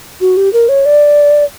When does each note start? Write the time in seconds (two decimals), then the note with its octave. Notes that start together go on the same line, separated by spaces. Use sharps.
0.21 F#4
0.37 G4
0.53 A#4
0.69 C#5
0.86 D5